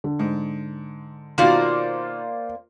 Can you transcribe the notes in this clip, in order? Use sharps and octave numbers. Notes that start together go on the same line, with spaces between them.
D3
G#2
B2 D#3 A#3 F4 C5 D5